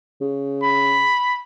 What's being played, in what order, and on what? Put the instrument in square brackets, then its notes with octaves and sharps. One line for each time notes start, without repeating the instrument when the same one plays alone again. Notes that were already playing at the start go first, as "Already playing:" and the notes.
[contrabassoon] C#3
[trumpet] B5